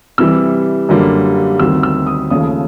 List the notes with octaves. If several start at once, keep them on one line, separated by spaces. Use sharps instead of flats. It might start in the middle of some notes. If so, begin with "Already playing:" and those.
C3 E3 G3 E6
F#2 D3 G3 A#3
D2 C3 D#3 G3 E6
E6
D#6
D#2 C#3 F3 A3 D#6